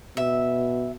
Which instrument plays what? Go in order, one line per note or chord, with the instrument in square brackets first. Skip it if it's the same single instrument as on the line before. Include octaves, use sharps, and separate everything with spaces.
[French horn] B2 [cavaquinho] E5